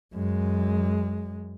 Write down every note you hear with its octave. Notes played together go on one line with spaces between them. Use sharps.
F#2 G#3